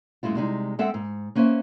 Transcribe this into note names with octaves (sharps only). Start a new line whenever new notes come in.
F#2 A2 G#3 E4 F4
C3 G3 G#3 D#4
G#3 C4 A4 E5 F#5 G5
G#2
A#3 C#4 B4 C5 E5